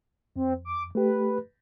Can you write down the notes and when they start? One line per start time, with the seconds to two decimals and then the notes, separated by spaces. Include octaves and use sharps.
0.36 F2 C4
0.65 D6
0.95 A3 G4 B4